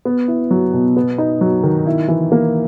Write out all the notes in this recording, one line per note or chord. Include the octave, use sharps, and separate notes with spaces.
B3
E4
F#3
B2
B3
D#4
F#3
D#3
E4
E3
A#3